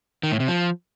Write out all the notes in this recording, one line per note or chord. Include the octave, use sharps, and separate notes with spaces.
D#3
A2
C3
F3